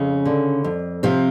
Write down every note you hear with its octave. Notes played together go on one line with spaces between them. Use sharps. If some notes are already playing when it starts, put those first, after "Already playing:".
Already playing: F2 C#3 C#4
D3
F2
C3 F3 C4